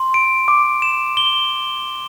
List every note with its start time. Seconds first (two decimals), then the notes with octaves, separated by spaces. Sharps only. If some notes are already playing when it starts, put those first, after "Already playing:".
Already playing: C6
0.14 D7
0.48 D6
0.82 E7
1.17 G7